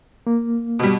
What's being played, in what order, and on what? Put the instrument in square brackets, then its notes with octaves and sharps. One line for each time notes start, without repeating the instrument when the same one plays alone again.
[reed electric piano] A#3
[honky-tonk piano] B2 G3